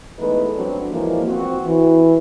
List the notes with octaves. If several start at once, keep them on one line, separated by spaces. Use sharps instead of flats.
E2 G#3 A3 D#4 B4
F#3 C4 D4
E3 F3 G#3 A#3
C4 F#4
E3